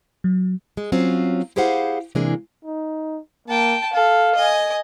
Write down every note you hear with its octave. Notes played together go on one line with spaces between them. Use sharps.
F#3
G#3
F#3 C4 C#4 F4
E4 G4 G#4 C5 F5 F#5
C3 E3 G#3 A#3 D4 G#4
D#4
A#3 G5 A5
A4 F5
D#5 G#5